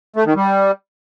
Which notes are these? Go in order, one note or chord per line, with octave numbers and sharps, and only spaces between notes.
A3
D#3
G3